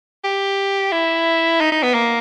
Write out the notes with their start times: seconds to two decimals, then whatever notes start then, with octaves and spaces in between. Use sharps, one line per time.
0.24 G4
0.92 E4
1.61 D#4
1.72 D#4
1.82 B3
1.94 A#3